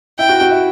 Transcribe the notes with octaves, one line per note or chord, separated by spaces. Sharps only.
E4 G5
F#4
F#4
E4